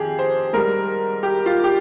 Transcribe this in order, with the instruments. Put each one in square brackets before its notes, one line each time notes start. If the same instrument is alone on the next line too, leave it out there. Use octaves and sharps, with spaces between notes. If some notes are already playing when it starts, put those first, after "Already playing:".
Already playing: [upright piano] F2 D#3 G4 G#4
C5
G#2 G3 A#4
G4
F4
G4